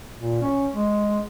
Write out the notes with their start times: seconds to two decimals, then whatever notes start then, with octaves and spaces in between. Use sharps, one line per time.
0.18 A#2
0.42 C#4
0.73 G#3